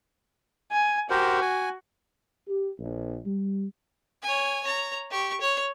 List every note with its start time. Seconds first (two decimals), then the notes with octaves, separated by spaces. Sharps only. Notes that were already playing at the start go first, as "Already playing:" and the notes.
0.72 G#5
1.10 F#4 G4 A#4 C5
1.41 G#5
2.47 G4
2.78 A#1
3.25 G3
4.23 C#5 G#5
4.64 C#5 A#5
5.11 G4 C#6
5.41 C#5